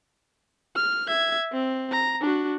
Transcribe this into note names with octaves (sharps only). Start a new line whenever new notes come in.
F6
E5 G#6
C4
A#5
D4 F#4